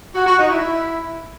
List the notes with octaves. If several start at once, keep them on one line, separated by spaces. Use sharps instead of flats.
F#4
F#4
D#4
E4